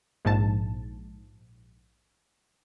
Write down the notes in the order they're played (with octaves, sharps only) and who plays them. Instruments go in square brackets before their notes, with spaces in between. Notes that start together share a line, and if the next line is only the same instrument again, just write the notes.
[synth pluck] A#1 G#2 A5